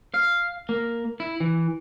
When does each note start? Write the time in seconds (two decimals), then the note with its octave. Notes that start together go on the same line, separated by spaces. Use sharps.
0.14 F5
0.69 A#3
1.20 E4
1.40 E3